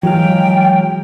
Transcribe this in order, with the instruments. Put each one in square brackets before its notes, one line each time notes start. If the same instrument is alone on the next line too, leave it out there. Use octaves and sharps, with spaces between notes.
[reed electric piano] E3 [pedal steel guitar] F#3 G#3 F5 [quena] G5